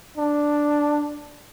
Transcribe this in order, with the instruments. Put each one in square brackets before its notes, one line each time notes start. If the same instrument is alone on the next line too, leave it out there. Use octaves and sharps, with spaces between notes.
[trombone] D4